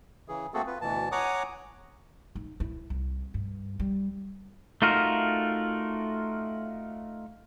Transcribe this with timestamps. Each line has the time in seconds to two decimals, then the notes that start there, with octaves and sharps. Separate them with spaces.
0.28 C#3 E3 G#4
0.54 A3 A#3 C4 F#4 G#4 A4
0.67 F4 B4
0.81 D2 B2 E3 A5
1.12 C#5 F#5 G#5 A#5 D6 D#6
2.35 D#4
2.60 E4
2.90 C2
3.34 G2
3.79 G3
4.82 A3 D#4 F4 F#4 A#4